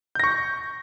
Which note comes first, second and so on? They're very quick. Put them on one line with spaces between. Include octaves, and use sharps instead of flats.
G6 A#6 C#6